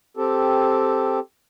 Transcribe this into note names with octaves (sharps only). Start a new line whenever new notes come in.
C4 G4 A4